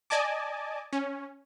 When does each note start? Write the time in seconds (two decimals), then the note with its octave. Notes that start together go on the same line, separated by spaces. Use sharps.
0.10 D5 D#5 G#5 A5 D6
0.93 C#4